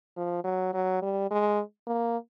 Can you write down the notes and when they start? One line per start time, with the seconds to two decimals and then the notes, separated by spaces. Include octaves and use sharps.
0.17 F3
0.44 F#3
0.74 F#3
1.02 G3
1.31 G#3
1.87 A#3